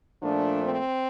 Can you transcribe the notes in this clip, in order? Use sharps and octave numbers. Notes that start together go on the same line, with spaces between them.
A#2 F3 A3 D4
C4